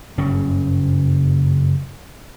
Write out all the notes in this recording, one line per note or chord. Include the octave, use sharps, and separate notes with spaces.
F#1 G2 C#3 C#4